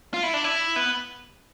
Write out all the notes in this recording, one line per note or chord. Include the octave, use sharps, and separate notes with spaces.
F4
E4
D4
E4
B3